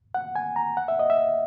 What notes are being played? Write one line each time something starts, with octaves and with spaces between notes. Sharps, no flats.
F#5
G#5
A#5
F#5
E5
D#5
E5